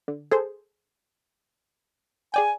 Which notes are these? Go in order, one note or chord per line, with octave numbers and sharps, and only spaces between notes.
D3
G#4 A4 C5
G#4 D5 G5 G#5